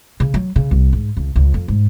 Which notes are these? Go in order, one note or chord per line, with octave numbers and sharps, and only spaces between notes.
C#3
F#3
C#3
C2
G#2
C#2
C#2
F2
G#2